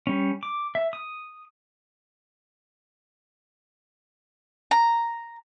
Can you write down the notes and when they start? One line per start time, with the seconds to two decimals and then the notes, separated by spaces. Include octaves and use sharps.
0.07 G3 C#4
0.43 D6
0.75 E5
0.93 D#6
4.71 A#5